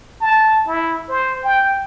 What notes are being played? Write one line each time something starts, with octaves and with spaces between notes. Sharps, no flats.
A5
E4
C5
G5